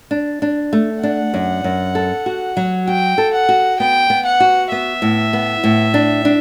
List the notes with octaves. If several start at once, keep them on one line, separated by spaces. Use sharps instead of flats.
D4
D4
A3
D4 F#5
F#2
F#2
A4
F#4
F#3
F#4 G5
A4
F#5
F#4
B3 G5
B3
F#5
F#4
B3 E5
A2
B3
A2
D4
D4